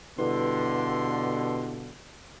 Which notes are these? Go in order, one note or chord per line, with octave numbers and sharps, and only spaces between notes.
G2 B2 D3 E4 G4 B4 C6